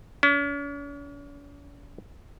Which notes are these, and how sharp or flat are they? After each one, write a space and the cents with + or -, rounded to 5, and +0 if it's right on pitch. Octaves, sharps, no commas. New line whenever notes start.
C#4 +45